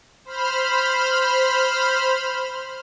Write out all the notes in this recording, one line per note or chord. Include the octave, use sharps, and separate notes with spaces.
C5 B5 F6